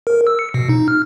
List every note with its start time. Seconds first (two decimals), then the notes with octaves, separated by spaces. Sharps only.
0.07 A#4
0.27 E6
0.39 C#7
0.54 B2
0.69 D#4
0.88 F6